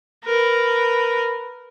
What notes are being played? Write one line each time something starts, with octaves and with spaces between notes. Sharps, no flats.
A#4 B4